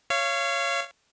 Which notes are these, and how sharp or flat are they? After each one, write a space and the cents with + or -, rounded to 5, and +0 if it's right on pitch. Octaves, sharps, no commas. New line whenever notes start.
C#5 +0 F5 -30